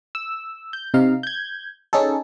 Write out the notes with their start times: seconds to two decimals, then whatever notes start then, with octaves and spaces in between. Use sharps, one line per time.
0.15 E6
0.73 G6
0.94 C3 D#4 F5
1.23 G6 G#6
1.93 C#4 D#4 G#4 A4